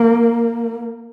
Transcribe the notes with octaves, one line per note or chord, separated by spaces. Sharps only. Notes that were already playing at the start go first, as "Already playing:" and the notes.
Already playing: A#3